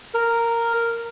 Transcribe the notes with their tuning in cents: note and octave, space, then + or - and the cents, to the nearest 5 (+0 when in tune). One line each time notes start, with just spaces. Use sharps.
A#4 -5